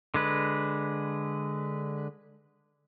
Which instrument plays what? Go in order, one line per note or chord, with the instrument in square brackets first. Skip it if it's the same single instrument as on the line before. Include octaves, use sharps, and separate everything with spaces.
[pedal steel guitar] D3 G#3 B4